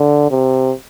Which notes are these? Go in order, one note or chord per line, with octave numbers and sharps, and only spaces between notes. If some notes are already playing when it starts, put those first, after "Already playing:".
Already playing: D3
C3